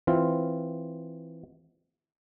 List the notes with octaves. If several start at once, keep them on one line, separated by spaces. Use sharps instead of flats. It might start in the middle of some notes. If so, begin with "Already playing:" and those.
E3 C4 F4